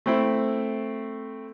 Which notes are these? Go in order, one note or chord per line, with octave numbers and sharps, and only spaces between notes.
A3 C4 E4